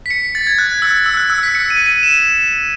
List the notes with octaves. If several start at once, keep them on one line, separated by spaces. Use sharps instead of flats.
B6
C#7
A6
G#6
F#6
E6
E6
F#6
E6
B6
C#7
D#7
D#7
E7